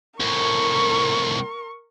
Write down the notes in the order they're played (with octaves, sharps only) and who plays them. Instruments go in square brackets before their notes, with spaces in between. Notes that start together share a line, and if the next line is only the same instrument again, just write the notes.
[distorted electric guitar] C2 A2 [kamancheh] A#4 C#6